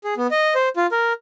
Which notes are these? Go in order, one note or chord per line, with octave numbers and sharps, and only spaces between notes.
G#4
B3
D#5
C5
F4
A#4